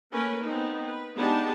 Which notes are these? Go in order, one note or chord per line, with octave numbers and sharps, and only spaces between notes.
A3 A#3 C#4 A#4 B4
B3 C4 D#4
B4
G#3 B3 D4 D#4 G4 A5